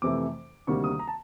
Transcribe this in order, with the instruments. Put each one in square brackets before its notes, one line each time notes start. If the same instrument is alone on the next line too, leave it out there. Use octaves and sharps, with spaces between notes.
[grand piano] F2 C3 E3 A3 D6
D2 C3 D#3 G3 A#3 C#6
D#6
A#5
A5